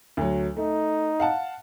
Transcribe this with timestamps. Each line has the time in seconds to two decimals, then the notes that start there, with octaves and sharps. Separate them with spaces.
0.17 D2 F#3
0.57 A3 D#4
1.20 F5 F#5 A5